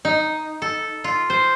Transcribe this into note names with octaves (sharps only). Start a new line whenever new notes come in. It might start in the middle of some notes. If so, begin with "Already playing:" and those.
D#4
A4
F4
C5